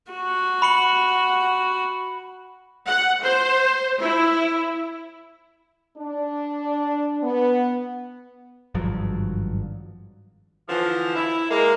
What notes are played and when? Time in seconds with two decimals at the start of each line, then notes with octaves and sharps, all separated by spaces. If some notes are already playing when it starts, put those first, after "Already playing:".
0.12 F#4
0.62 B5 C#7 F#7
2.87 F#5
3.21 C5
4.00 E4
5.97 D4
7.23 B3
8.75 G#1 G2 F3 F#3
10.69 D3 E3 F3
11.16 E4
11.50 G#3 A#3